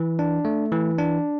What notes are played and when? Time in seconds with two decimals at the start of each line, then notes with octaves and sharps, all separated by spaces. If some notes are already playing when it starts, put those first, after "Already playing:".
Already playing: E3
0.19 D4
0.45 A3
0.72 E3
0.98 D4